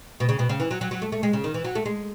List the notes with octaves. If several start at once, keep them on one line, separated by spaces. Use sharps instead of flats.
B2
C#3
B2
C#3
E3
F#3
F#3
F#3
A3
A3
G#3
C#3
D#3
E3
F#3
A3
G#3